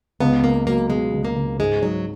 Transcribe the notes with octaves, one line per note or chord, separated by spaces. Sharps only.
C#2 B3
C#2 A#3
F#3 A#3
B2 G#3
C#2
A#3
C#2
G#2 G#3
F#3 D#4